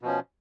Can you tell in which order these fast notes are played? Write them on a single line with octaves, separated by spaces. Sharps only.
B2 F3 C#4